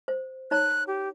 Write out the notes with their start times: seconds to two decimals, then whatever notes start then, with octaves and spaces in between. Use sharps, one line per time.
0.08 C5
0.51 D#4 C#5 A#5 F#6
0.87 G4